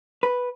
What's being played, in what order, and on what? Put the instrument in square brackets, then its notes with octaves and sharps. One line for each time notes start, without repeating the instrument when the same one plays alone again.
[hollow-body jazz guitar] B4